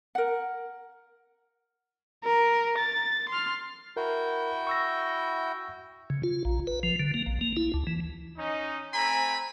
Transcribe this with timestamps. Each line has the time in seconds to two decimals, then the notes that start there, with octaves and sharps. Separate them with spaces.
0.15 A#4 F#5
2.24 A#4
2.78 A6
3.29 C6 F6
3.97 E4 F#4 A#4 G5
4.67 C#6 E6 A#6
6.10 C#3
6.23 F4
6.45 A#1
6.67 B4
6.83 F3
6.99 D3
7.14 A#3
7.26 A#1
7.41 A#3
7.57 E4
7.74 D2
7.87 E3
8.37 C#4 D#4
8.94 A3 C4 G#5 A#5 B5